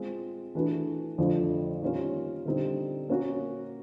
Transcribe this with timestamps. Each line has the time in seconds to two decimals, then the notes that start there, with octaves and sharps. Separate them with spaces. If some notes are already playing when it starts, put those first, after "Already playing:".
Already playing: G#3 C4 F4
0.55 E3 A3 D4 F#4 B4
1.18 F2 D3 F3 A3 D4
1.82 D#3 G3 A#3 C#4 F4
2.45 D3 G3 C4 D#4
3.09 A#3 C#4 F#4